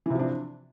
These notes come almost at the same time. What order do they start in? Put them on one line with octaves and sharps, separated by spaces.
E3 C3 F3 D4